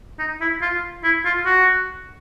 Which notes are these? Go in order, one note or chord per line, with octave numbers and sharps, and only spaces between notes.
D#4
E4
F4
E4
F4
F#4